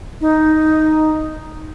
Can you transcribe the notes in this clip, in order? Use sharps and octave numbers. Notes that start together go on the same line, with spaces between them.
D#4